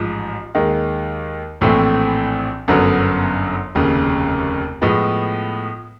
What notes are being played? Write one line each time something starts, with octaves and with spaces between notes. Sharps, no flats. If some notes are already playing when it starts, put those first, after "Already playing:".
Already playing: A1 G#2 F3
D#2 D#3 G#3
A#1 A2 E3 A3 C4
G1 F#2 D3 F#3 B3
F1 D#2 C#3
A2 F3 G#3 B3